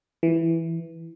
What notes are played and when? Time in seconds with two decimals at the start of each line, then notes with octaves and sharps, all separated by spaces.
0.23 E3